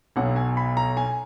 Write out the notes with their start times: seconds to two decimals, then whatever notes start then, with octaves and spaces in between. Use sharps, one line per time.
0.16 B1 B2 F#3 F#5
0.36 G#5
0.57 B5
0.77 A#5
0.97 G#5